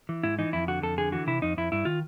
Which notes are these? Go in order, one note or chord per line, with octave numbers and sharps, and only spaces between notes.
E3
G#2 E4
E3 D#4
F2 E4
D3 F#4
F2 A4
D3 G#4
E3 F#4
C3 E4
F2 D#4
F2 E4
G2 E4
D#3 F4